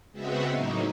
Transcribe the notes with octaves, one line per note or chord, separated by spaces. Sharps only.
C#3 G#3 B3 C4 F#4 E5
A2 F#3 A#3 D#4